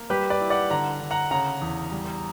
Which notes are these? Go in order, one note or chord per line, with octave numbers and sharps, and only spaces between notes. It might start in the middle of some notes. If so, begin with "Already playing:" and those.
Already playing: A#3
G3 G4 B4
B4 D5
E4
D5 F#5
D3 F#5 A#5
D3
F#5 A#5
C#3 F#5 A#5
E2
G3